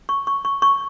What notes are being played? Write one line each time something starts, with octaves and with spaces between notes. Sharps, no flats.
C#6
C#6
C#6
C#6